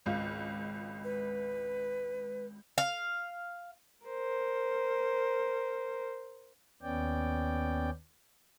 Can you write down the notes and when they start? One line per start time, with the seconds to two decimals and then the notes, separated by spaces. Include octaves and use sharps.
0.06 G#1 C#2 F4
1.04 B4
2.78 F5
4.06 A#4 C5
6.82 D#2 B3 C#4 D5 G5